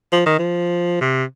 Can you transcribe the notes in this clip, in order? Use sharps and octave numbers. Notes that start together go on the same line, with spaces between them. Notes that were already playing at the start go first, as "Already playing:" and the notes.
F3
D#3
F3
C3